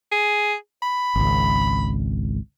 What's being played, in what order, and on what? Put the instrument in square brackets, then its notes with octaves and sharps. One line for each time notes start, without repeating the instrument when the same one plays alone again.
[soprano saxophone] G#4
B5
[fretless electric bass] G#1 C#2